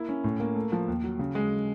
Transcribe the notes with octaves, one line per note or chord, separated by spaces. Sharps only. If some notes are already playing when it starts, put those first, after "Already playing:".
Already playing: A#3 E4
C#4
A2
A#3
A3
F3
D#2
F#3
C#3
G#3